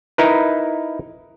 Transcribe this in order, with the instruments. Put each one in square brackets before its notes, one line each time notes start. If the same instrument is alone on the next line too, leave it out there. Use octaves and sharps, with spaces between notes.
[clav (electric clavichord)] D#4 E4 A#4 B4